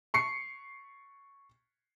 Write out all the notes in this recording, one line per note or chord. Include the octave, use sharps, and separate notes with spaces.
C#6 C7 C#7